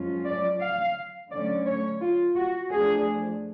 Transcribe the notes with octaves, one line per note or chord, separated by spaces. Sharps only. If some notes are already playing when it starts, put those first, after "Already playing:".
Already playing: F#2 F3 G#3 C#4 F4
D5
F5
D3 F#3 A3 C#4 D5
C#5
F4
F#4
F2 F3 A3 D4 G#4